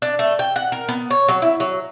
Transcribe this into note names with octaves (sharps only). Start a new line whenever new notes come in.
D4
A3
G5
F#5
A#4
B3
C#5
F#3
E4
F#3